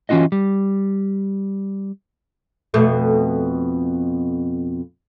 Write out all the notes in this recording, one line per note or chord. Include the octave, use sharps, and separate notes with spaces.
E3 C#4 F4 F#4 D#5
G3
F2 B2 A3